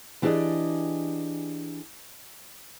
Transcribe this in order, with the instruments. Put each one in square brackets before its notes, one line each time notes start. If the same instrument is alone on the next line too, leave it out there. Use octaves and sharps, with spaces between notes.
[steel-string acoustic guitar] E3 D4 G4 G#4 D5 D#5